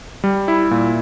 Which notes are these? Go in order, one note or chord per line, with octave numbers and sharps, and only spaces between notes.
G3
E4
A#2